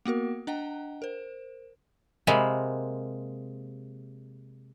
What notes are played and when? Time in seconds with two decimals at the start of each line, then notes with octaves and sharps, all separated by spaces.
0.05 A#3 B3 F#4 A#4
0.47 D4 D#5 F#5 G5 A#5
1.02 A#4 C5
2.27 C3 G#3 A#3 B5